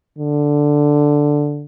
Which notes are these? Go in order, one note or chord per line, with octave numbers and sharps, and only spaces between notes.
D3